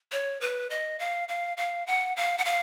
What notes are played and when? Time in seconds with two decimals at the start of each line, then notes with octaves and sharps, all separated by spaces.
0.12 C#5
0.41 B4
0.70 D#5
0.99 F5
1.28 F5
1.57 F5
1.87 F#5
2.16 F5
2.38 F#5
2.45 F5